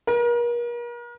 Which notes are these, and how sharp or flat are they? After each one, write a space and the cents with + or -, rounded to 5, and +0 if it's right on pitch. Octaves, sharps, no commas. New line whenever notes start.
A#4 +40